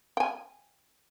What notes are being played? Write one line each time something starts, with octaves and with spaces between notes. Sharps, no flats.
G5 G#5